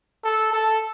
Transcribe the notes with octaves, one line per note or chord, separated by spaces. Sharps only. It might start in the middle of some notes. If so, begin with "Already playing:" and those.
A4
A4